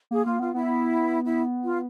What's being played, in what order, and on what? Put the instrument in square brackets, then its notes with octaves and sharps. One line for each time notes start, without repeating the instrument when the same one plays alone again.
[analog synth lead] A#3 [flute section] G#4
[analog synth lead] A#3 [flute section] F4
[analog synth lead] B3 [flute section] F4
[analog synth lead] B3 [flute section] E4
[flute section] E4
F4